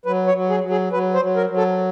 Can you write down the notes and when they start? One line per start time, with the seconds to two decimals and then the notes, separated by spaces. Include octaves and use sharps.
0.05 F#3 B4
0.27 C#5
0.35 F#3
0.50 G#4
0.63 F#3
0.70 G#4
0.92 F#3 B4
1.14 C5
1.22 F#3
1.36 A#4
1.49 F#3
1.57 A4